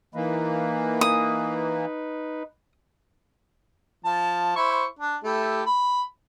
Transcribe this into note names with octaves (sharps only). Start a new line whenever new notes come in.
E3 A#3 D#4 B4
D#6
F3 A5
E4 C5 C#6
D4
A3 E4 G4
B5